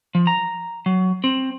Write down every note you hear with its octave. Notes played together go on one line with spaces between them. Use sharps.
F3
A#5
F#3
C4